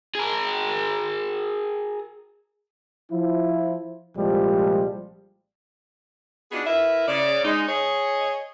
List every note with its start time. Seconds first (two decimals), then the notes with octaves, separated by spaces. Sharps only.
0.15 G#4 A#4
3.12 F3 E4
4.17 C2 A#2 F3 G3 G#3
6.52 B3 D4 D#4 F4 F#4 G#4
6.67 E4 A#4 B4 E5
7.08 C#3 D5
7.45 G#3 D#4
7.68 G#4 C#5 D#5